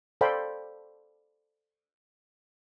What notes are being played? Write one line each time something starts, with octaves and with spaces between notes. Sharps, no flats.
A4 C5 D5 F5 G5 B5